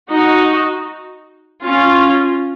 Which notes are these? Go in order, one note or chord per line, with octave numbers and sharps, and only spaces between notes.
D#4 F#4
C#4 F4